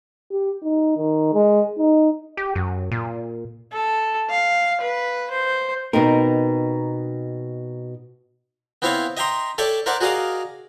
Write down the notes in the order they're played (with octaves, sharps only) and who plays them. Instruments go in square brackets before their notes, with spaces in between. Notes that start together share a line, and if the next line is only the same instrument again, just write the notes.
[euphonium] G4
D#4
D#3
G#3
D#4
[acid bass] G4
F#2
A#2
[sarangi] A4
F5
B4
C5
[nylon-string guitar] B2 C4 [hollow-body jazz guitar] D#4 A#4
[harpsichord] B3 C4 E4 C#5 E5 F5
D#5 E5 G5 A#5 C6
A4 C#5 D5 E5 G5 A5
A#4 C5 D5 E5 F#5 A5
F#4 G#4 A#4 D5 D#5 F5